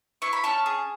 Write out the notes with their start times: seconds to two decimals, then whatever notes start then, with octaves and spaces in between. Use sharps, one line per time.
0.22 E4 C#6
0.33 B5
0.44 C#4 A5 C#6
0.66 G#4